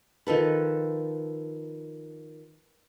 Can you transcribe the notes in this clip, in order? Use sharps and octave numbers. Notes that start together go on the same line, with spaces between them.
D#3 F3 A4 B4